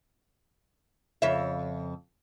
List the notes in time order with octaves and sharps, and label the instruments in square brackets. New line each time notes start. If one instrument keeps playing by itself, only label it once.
[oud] F2 C#3 E5